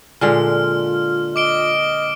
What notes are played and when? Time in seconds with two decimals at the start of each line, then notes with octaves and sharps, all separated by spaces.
0.21 A#2 D3 G#3 F4 F6
1.36 D#5 D6 D7 G7